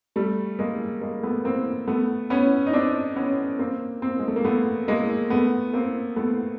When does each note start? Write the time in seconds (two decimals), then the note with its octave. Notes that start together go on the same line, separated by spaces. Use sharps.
0.16 G3 A3
0.59 G#3 A#3
1.01 G#3 A#3
1.23 A3 B3
1.45 A#3 C4
1.88 A3 B3
2.30 B3 C#4
2.67 D#4
2.73 C4 D4
3.16 B3 C#4
3.59 A#3 C4
4.02 A#3 C4
4.19 G#3
4.28 A3
4.36 A#3
4.45 A3 B3
4.88 G#3 A#3
5.30 A3 B3
5.73 A#3 C4
6.16 A3 B3